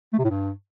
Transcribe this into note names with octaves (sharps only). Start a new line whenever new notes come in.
A3
C3
A2
G2